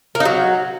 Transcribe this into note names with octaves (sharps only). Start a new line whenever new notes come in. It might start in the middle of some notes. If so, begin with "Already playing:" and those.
A#3
D#4
F#3